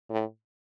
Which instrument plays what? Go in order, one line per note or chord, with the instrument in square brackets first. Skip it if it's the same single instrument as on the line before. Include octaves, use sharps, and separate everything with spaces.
[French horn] A2